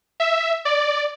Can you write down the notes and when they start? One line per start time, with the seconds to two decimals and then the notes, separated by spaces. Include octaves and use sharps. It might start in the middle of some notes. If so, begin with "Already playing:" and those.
0.20 E5
0.65 D5